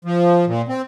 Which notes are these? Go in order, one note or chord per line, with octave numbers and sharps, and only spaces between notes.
F3
A#2
C4